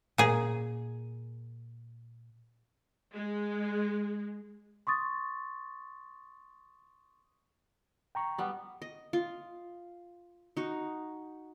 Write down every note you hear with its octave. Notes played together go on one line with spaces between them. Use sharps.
A#2 G#4
G#3
C6 C#6 D#6 A6
G5 A#5 C#6
G3 B3
D#5
F4
D#4 F#4